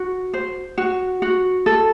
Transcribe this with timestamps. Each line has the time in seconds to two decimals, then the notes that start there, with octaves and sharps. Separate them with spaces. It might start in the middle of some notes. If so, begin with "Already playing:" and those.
Already playing: F#4
0.33 C5
0.78 F#4
1.22 F#4
1.66 A4